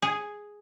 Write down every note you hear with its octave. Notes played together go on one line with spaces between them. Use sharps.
G#4